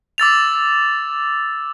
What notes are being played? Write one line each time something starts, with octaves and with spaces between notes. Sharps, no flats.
D6 E6 A6 F7